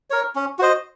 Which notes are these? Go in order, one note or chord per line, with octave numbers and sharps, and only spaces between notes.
A#4 C#5
C#4
F#4 C5 D#5